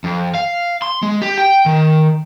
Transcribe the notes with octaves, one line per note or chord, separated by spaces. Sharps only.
F2
F5
C6
G#3
G4
G5
D#3